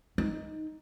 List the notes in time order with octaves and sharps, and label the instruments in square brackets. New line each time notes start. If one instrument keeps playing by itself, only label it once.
[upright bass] D#4